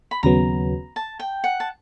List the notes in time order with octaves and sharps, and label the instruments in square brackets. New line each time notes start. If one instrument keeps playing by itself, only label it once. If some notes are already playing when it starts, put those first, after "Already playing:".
[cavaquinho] B5
[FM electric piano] D#2 C#3 F#3 B3 [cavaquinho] A#5
[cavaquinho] A5
G5
F#5
A5